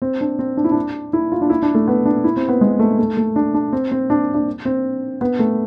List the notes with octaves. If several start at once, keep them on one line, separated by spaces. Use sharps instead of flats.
C4
D4
C4
D4
E4
D4
E4
F4
D4
E4
D4
A3
B3
D4
E4
C4
B3
G#3
A3
A3
A3
D4
D4
C4
C4
D4
D4
C4
B3
A3